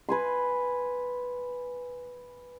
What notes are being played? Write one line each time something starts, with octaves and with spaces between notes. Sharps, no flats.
B4 G#5 C6